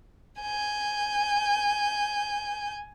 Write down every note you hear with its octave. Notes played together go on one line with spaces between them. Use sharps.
G#5 G6